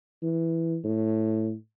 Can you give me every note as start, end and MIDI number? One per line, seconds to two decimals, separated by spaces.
0.23 0.78 52
0.84 1.54 45